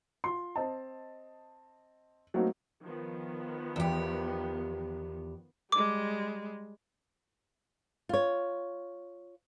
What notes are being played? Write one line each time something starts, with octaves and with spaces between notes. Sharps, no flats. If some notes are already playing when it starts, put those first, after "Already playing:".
F4 C6
C4 D#5 A5
F#3 A3 A#3 C4 D#4 F#4
D#3 F3 B3
E2 G4
G3 G#3 D6
F4 C#5